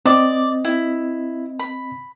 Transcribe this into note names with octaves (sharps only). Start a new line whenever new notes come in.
C4 D5 D#5 D6
E4
B5